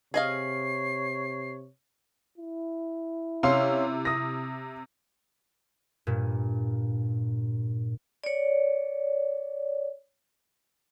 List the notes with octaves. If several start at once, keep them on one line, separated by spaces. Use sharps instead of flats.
C3 G#4 C#5 D#5 F5 C7
E4
C3 C#4 F5 C6
D#6 A#6
G2 A#2
C#5 D5